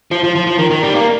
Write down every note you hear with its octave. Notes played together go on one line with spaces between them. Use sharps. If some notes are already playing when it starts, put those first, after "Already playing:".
F3
F3
F3
F3
D#3
D#3
G3
A#3